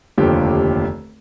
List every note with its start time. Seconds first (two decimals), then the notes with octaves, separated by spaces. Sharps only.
0.18 F1 D#2 D3 F3 G4